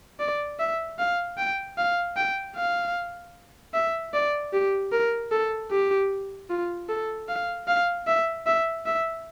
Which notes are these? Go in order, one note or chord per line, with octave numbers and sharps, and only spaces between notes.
D5
E5
F5
G5
F5
G5
F5
E5
D5
G4
A#4
A4
G4
F4
A4
F5
F5
E5
E5
E5